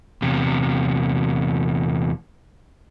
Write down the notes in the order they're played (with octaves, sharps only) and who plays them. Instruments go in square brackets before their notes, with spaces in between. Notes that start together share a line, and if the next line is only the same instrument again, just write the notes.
[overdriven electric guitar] E2 C3